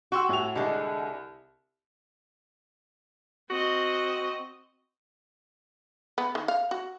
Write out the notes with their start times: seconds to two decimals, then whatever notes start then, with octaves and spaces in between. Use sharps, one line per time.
0.12 F#4 G5 C6 E6
0.29 A2 G#5 F7
0.56 C2 D3 G#3
3.50 C4 F#4 D#5
6.18 B3
6.35 D#3
6.48 F5
6.71 F#4